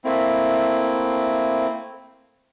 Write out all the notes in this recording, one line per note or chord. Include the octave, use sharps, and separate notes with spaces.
A3 A#3 C4 E4